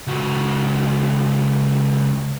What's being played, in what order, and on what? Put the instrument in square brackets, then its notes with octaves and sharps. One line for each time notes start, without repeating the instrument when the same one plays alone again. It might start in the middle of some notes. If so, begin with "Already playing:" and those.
[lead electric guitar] C#2 F#4